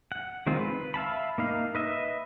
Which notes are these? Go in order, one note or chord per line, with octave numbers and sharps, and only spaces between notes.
F#5
D#3 G#3 C4 F4
B4
E5 F5 A5 B5
A#3 D#4 F5
B4 D#5 E5